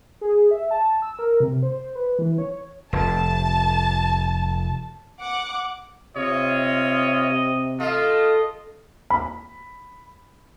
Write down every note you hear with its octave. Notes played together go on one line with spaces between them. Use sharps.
G#4
E5
A5
E6
A#4
C3
C5
B4
E3
C#5
F1 A5
F#5 D6
C3 F4 C#5 D#5 E5
A3 F4 D#5
B5